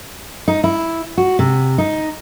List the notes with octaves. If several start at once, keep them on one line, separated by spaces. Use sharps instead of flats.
D#4
E4
F#4
C3
D#4